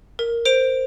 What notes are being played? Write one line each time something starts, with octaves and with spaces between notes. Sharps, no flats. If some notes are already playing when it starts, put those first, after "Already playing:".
A#4
C5 D7 F7